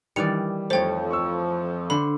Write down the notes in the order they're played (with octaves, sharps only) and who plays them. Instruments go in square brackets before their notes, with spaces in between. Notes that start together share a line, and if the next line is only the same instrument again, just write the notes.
[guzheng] D#3 E3 D5 [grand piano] G3 [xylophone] C#7 F7
[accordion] F2 F3 [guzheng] A3 C#5 [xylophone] C5 G5
[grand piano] C#6 E6
[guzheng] D3 C5 [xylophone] B5